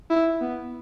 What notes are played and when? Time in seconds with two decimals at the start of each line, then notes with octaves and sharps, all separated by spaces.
0.10 E4
0.42 B3